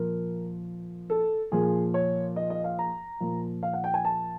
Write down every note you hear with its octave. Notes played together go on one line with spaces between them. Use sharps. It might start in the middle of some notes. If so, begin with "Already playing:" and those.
Already playing: A#2 F3 A#4
A4
A#2 F3 G#4
C#5
D#5
D#5
F5
A#5
A#2 F3
F5
F#5
G5
G#5
A5